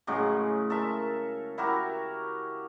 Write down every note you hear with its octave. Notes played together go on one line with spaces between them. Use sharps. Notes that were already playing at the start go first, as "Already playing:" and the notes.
A2 C#3 F#3 G#3
A4 A#4 E5
E4 F#4 G4 A#4